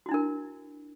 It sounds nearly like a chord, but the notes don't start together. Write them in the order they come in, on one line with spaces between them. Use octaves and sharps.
F#4 E4 D4 A#4